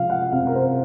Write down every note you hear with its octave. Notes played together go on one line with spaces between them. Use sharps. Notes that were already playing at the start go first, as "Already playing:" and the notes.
Already playing: C3 F3 F5
F#5
C3 F5
A#4
C5